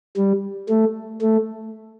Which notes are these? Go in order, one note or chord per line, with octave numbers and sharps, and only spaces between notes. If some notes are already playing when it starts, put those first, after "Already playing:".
G3
A3
A3